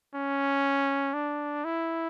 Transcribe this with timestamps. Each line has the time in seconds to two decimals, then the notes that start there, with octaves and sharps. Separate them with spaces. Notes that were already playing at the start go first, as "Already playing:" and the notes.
0.14 C#4
1.14 D4
1.64 E4